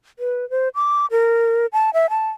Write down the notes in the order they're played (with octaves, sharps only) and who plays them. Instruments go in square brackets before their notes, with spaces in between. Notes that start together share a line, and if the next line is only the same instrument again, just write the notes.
[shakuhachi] B4
C5
D6
A#4
A5
E5
A5